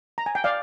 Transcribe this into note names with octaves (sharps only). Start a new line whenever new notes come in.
A#5
G#5
G5
D5 F5